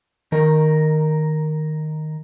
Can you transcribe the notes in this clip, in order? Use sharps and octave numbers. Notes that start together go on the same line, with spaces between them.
D#3 A#4